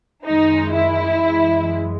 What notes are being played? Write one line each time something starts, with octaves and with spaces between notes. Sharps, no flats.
F#2 D#3 G#3 D#4
E4
F#2 E3 G#3